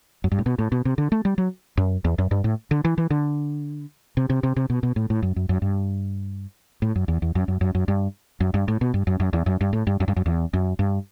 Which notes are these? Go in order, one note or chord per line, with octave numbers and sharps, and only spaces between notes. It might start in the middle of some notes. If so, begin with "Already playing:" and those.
F#2
G2
A2
B2
A2
B2
C3
D3
A3
G3
F#3
F#2
E2
F#2
G2
A2
D3
E3
E3
D3
C3
C3
C3
C3
B2
B2
A2
A2
F#2
F#2
F#2
G2
A2
F#2
E2
E2
F#2
F#2
F#2
F#2
G2
F#2
G2
A2
B2
G2
F#2
F#2
E2
F#2
G2
A2
G2
F#2
G2
F#2
E2
F#2
G2